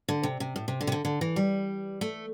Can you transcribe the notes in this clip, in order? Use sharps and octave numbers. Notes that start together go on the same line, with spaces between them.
D3
C3
C3
A2
C3
D3
C3
D3
D3
E3
G3
A3